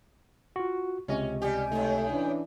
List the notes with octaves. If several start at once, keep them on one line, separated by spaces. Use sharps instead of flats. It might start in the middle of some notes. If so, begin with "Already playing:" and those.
F4 F#4
C#2 C3 C#4 D#5
G3 G4 G#5
A2 A3 D#4
E3 C#4 D4